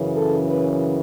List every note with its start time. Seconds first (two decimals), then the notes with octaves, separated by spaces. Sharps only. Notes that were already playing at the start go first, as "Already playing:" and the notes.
Already playing: F#2 C#3 E3
0.16 A4
0.47 B4